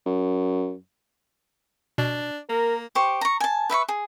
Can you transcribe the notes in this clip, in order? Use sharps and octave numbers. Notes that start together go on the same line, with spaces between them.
F#2
B2 D4
A#3 A#4
G4 C5 C#6
A#5 C#6
G#5 A5
B4 E5 B5 C#6
G#4